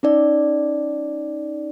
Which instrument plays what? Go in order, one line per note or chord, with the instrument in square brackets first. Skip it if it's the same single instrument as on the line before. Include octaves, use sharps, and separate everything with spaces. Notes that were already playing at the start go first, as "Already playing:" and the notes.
[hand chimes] C#4 D#4 D5